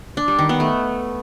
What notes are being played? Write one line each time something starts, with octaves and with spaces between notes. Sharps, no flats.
D4
G3
D#3
B3
A3